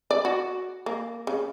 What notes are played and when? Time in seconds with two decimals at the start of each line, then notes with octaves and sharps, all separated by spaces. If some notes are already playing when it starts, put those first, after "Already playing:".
0.11 D5
0.25 F#4
0.86 A#3
1.27 C#3